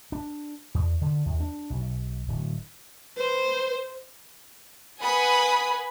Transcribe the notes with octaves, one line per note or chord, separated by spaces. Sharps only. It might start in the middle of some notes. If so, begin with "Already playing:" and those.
D4
E2
D3
D#2
D4
B1
D1
B4 C5
B4 F#5 G#5 B5 D#6